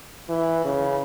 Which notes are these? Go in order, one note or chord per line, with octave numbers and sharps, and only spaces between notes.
E3
C#3